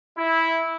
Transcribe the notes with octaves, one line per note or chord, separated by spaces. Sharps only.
E4